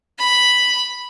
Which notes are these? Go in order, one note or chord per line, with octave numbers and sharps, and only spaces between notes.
B5